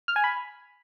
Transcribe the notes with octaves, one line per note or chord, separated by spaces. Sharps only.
F6
G#5
B5